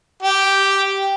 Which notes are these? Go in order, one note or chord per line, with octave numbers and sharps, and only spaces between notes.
G4